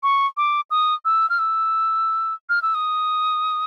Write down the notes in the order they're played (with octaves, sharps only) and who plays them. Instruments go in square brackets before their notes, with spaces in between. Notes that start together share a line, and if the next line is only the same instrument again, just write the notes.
[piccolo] C#6
D6
D#6
E6
F6
E6
F6
E6
D#6